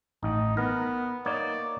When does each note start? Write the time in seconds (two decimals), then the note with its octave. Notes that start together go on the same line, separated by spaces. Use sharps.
0.23 A1 D#4
0.57 B3 A#4
1.26 A#3 D#4 C#5 D5